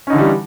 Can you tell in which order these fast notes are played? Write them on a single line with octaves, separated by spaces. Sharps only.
C#4 D#4 D3 E3 G3